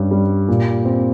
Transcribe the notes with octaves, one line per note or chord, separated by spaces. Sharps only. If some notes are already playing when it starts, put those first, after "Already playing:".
Already playing: G2 C#4
G3
A#2
C4